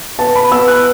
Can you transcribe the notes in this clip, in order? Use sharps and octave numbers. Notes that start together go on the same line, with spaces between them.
B3 A5
B5
B3 E6
F#6